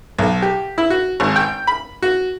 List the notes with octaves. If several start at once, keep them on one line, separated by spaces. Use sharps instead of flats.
B1
G4
E4
F#4
G#1
G5
B5
F#4